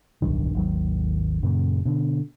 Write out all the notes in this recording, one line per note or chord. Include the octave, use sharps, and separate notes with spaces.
D1 B1 G2 D#3
G#1 D#2 D#3 F#3
F#2 A#2 C#3
B2 D3